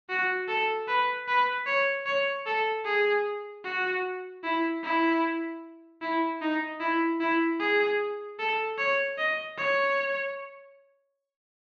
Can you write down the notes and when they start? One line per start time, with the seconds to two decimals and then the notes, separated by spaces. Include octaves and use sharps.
0.09 F#4
0.48 A4
0.88 B4
1.28 B4
1.67 C#5
2.06 C#5
2.46 A4
2.85 G#4
3.65 F#4
4.44 E4
4.83 E4
6.02 E4
6.42 D#4
6.81 E4
7.21 E4
7.60 G#4
8.39 A4
8.78 C#5
9.18 D#5
9.58 C#5